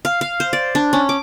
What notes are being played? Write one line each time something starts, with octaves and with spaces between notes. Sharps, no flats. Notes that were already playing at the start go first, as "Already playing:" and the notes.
F5
F5
C5
D5
D4
C#4
D6